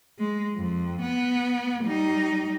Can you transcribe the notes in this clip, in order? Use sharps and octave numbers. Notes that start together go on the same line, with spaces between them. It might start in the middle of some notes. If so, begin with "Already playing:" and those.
G#3
F2
B3
G3 D#4